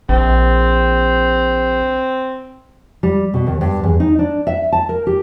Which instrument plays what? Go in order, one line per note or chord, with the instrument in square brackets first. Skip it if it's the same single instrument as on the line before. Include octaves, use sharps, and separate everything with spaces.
[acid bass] A#1 [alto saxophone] C4
[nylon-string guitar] G3
B2
D#2
G2
E2
D#4
D4
E5
A5
A#4
G4